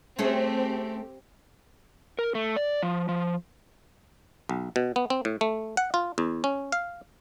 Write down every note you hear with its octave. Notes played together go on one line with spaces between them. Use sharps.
A3 C4 C#4 G4 G#4
A#4
A3
D5
F3
F3
B1
B2
B3
C4
A2
A3
F#5
F4
E2
C#4
F5